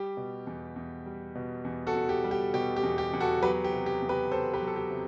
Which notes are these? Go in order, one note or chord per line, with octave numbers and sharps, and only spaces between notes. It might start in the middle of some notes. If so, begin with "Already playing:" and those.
Already playing: G3 G4
B2
E2
E2
G3
B2
E2
F#4 A4
E2
G4
G3
G4
B2 G4
G4
E2
G4
E2
F#4 A4
F#3 G4 B4
G4
C3
G4
E2
G4 B4
B3 A4 C5
G4 B4
F#3
A4
G4
C3